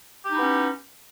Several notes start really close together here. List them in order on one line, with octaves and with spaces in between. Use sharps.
G4 D#4 E4 B3 C#4